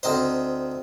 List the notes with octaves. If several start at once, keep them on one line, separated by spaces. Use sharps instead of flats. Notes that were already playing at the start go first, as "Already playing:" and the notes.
D2 C4 D#4 C5